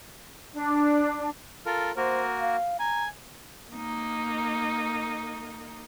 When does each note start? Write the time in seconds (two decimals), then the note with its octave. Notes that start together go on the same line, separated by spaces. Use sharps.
0.54 D4
1.66 F4 A4 A#4
1.97 A#3 F#4 A#4 C5
2.40 F5
2.79 G#5 A#5
3.72 A#3 D#4